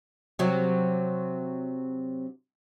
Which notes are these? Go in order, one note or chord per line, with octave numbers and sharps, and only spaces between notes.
C3 F#3